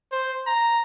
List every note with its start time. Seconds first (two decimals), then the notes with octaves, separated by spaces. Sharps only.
0.12 C5
0.47 A#5